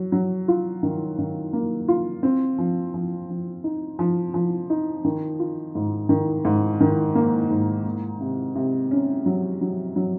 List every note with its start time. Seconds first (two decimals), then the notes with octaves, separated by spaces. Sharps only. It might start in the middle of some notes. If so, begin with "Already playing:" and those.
Already playing: F#3
0.12 F#3
0.48 F4
0.83 D#3
1.18 D#3
1.53 A#3
1.88 F4
2.23 C4
2.58 F3
2.94 F3
3.29 F3
3.64 D#4
3.99 F3
4.34 F3
4.70 D#4
5.05 D#3
5.39 F4
5.75 G#2
6.09 D#3
6.45 G#2
6.81 D#3
7.15 A#3
7.50 G#2
7.85 A#3
8.21 C3
8.55 C3
8.91 C#4
9.26 F#3
9.61 F#3
9.96 F#3